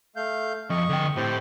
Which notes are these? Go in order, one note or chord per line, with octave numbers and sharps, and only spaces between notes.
A3 F5 G6
F2 D#5 C#6
D3 G5
A2 C4 G4